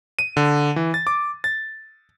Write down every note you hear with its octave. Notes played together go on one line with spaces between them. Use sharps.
D#7
D3
E3
A6
D6
A6